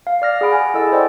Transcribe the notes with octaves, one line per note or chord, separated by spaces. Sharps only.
F5
D5 F6 A#6
G#4 F#5 B5 D7
G#5
E4 A4 D#5 E6 A6
C5 D5 D#5 F#5 G5 A5